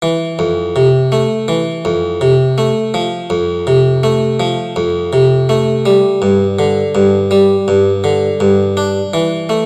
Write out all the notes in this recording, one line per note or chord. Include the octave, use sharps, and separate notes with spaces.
E3
F2
C3
A3
E3
F2
C3
A3
F3
F2
C3
A3
F3
F2
C3
A3
G3
G2
D3
G2
G3
G2
D3
G2
D4
E3
A3